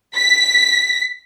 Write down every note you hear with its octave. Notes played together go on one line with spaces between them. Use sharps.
B6